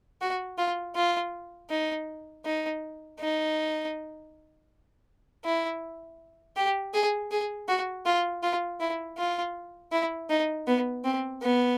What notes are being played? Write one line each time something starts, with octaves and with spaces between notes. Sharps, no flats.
F#4
F4
F4
D#4
D#4
D#4
E4
G4
G#4
G#4
F#4
F4
F4
E4
F4
E4
D#4
B3
C4
B3